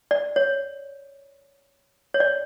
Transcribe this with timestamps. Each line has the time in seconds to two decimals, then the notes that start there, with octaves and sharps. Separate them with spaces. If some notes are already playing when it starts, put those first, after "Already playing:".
0.11 D5
0.36 C#5
2.14 C#5
2.20 D5